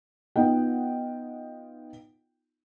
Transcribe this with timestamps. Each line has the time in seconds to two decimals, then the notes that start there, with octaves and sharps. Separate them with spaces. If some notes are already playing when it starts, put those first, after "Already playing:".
0.36 B3 D#4 F4 D#5 F#5 G5